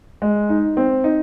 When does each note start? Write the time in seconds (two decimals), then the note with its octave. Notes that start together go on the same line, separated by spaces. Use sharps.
0.22 G#3
0.49 D#4
0.77 C4
1.04 D#4